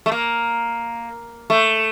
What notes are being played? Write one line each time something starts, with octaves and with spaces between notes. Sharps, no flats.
A3
A#3
A3